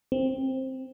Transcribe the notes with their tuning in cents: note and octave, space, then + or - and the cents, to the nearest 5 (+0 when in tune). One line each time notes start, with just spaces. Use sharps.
C4 +10